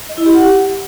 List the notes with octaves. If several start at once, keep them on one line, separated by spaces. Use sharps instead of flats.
D#5
E4
G4
F#5